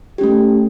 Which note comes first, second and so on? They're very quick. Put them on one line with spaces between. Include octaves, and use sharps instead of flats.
G4 C#4 A3